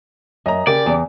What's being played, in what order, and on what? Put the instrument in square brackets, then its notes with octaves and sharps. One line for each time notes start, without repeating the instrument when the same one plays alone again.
[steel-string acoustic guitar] F#2 [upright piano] D#5 E5 A#5
[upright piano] C#3 G4 [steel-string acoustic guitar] A#4 [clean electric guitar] D5
[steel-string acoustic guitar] E2